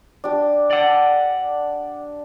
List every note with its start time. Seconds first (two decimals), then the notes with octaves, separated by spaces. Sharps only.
0.24 D4 G4
0.71 D5 F#5